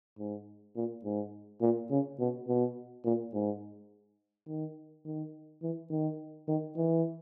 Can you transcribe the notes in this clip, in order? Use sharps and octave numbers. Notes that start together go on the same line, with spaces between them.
G#2
A#2
G#2
A#2
C#3
B2
B2
A#2
G#2
D#3
D#3
E3
D#3
D#3
E3